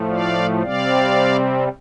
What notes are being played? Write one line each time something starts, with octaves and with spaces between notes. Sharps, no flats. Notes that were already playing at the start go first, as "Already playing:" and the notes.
Already playing: A2 F3 A3
D5 F5
C3 G3 C4 D5 F5